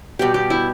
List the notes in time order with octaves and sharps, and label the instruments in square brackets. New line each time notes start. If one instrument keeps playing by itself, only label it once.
[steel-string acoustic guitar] B2 G3 B3 [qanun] G4
[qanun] G4
E4